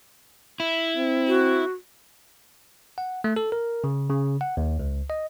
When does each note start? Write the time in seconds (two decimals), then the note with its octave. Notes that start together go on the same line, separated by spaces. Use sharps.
0.60 E4
0.97 C4
1.28 F#4
2.98 F#5
3.24 A3
3.36 A4
3.52 A#4
3.84 C#3
4.10 C#3
4.41 F#5
4.57 D#2
4.79 C#2
5.10 D#5